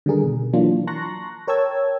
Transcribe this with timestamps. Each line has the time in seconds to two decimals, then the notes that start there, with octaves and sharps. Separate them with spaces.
0.06 D3 D#3 G3 G#4 A#4
0.23 B2
0.53 E3 F#3 A#3 D4 F4
0.87 A5 A#5 C6 C#6 F#6 A#6
1.47 A#4 C#5 G5 A5 E6 G#6